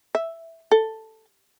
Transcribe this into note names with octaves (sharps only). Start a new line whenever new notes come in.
E5
A4